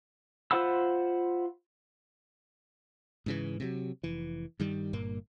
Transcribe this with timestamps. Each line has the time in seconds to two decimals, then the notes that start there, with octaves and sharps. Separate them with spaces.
0.51 F4 C5 F#5 B5 E6
3.26 G#2 C#3 E3
3.60 C3 F3 F#3
4.03 F1 E3
4.60 G2 D#3 G3
4.93 G1 G2 A#2 A#3